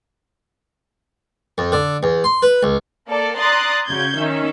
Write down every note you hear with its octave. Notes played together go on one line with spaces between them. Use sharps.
F2
D3
E2
C6
B4
C#2
A#3 A4 D5
D5 A#5 C6 D#6 F#6 A6
C#3 F#4 G6 G#6
D#3 C#4 E5